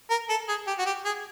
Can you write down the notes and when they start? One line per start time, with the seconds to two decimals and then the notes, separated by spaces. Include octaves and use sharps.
0.10 A#4
0.29 A4
0.48 G#4
0.67 G4
0.78 F#4
0.86 G4
1.05 G#4